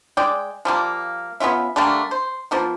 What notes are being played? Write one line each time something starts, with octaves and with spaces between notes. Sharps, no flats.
G#3 D5 G5
F3 G3 A#3
B3 C#4 F4 E5
D3 G3 A3 A#3
C5
F3 A#3 B3